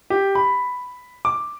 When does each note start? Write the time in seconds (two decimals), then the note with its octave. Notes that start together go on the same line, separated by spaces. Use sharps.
0.10 G4
0.35 B5
1.25 D6